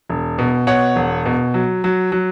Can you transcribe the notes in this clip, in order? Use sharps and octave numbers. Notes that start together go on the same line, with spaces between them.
E1
B2
B2 C#5 F#5
E1
B2
F#3
F#3
F#3